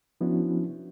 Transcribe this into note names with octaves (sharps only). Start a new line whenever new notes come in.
F3 B3 C#4 D4 E4 F#4